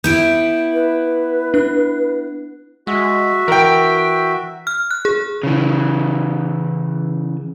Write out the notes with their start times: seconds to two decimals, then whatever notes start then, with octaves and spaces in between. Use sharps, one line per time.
0.04 B3 E4 G4 G6 D7
0.74 B4
1.54 D4 F#6
2.87 G#3 F#4 E5
3.48 E3 A#4 G5
4.67 F6
4.91 F#6
5.05 G#4
5.43 C#3 E3